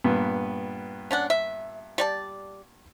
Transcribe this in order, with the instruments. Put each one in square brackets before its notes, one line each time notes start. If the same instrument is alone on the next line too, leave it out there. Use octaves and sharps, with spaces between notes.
[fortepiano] G2 A#2 B3
[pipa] C#4 D4 F#5
E5
G3 D5 A5